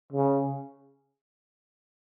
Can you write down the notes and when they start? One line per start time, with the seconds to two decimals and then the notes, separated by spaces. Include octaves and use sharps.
0.12 C#3